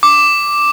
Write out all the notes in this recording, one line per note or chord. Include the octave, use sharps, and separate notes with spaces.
D6